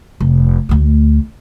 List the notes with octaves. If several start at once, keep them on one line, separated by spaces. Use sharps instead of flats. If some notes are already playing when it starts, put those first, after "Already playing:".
F1
D2 A3